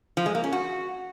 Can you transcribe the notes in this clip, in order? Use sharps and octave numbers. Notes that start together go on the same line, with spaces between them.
F3
G#3
A#3
C#4
F#4